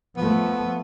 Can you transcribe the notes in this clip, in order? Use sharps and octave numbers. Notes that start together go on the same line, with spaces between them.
F3 A3 B3